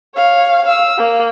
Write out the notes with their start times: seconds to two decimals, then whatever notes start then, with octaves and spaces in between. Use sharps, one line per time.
0.16 C#5 F5
0.65 F5 E6
0.98 A#3